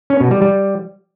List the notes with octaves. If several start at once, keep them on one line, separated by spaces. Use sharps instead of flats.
C#4
B2
G3
G3